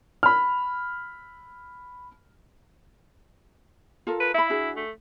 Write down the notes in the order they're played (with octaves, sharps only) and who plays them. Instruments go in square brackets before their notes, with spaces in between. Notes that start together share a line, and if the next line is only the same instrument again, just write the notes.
[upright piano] B5 F6
[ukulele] F4 A4 A#4
[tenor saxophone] B4
[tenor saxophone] E4 [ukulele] E5 B5
[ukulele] D4 F#4 G#4
[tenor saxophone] A3